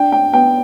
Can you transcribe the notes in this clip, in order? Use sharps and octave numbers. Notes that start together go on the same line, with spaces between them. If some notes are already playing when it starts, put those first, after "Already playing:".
Already playing: D4 G5
G5
B3 G5